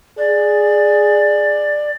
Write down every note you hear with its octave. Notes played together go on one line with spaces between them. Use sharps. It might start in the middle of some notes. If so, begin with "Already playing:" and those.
G#4 D5